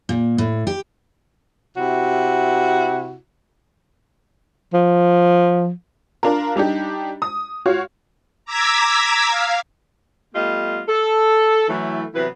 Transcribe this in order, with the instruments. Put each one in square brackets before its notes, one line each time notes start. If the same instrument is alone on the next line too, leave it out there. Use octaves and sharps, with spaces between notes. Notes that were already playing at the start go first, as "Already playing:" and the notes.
[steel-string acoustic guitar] A#2
A2
G4
[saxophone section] C3 E4 F#4
[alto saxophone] F3
[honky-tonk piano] D4 F4 A#4
G3 D4 D#4 G4
D#6
F4 F#4 C#5 F5
[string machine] A#5 D6 E6 G#6 B6
F5
[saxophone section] G3 A3 B3 F4 G4 D#5
A4
E3 F#3 A3
C3 E3 F#3 B3 E4 B4